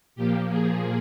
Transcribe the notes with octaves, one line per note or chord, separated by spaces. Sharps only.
A#2 F3 A#3 G4
G#4